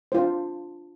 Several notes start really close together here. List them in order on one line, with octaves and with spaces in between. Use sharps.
C5 F4 D4